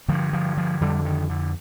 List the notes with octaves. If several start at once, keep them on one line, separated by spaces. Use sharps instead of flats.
G2 D3 F3
F3
F3
F2 D3 G3
D#3
D3